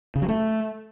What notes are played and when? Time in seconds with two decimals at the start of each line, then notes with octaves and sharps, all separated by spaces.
0.15 C#3
0.22 F#3
0.28 A3